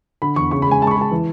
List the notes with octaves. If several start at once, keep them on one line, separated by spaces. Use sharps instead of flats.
D3 B5
E2 C#6
C#3 C#6
B5
G#3 G#5
G#3 A5
C#6
B5
G#3
A5
E3